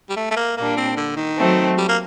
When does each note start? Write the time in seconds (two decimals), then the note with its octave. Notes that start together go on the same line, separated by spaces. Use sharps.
0.10 G3
0.16 A3
0.31 A3
0.36 A#3
0.57 A#2 G3 A#3 D4
0.77 C4
0.97 D3
1.17 D#3
1.37 F#3 A3 C4
1.78 G3
1.89 A#3